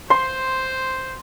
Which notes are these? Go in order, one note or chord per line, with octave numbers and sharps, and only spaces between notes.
C5 C6